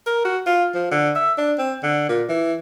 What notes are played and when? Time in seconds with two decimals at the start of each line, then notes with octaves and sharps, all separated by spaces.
0.06 A#4
0.25 F#4
0.46 F4
0.74 F3
0.91 D3
1.16 E5
1.38 D4
1.58 C4
1.83 D3
2.09 A#2
2.29 E3